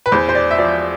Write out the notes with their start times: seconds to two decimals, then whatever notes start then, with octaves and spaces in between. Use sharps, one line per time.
0.06 B4
0.12 E2 C5
0.29 C5
0.35 D5
0.51 E5
0.59 F3 D5